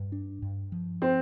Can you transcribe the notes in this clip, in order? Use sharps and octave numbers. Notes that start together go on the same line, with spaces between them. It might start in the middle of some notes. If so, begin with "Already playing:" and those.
Already playing: G2
D4
G2
F3
C4